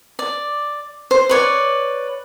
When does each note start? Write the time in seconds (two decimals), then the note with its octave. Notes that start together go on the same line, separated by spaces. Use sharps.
0.19 D5
1.11 C5
1.29 B4 C#5 D5